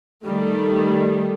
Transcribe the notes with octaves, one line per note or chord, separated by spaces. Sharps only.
D#3 G3 A3